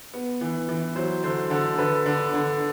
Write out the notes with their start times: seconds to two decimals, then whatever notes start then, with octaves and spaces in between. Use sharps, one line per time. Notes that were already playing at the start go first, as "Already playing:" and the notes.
0.13 B3
0.41 E3
0.69 E3
0.96 F#3 C5
1.23 D3 C5
1.50 D3 A4
1.78 D3 B4
2.06 D3
2.34 D3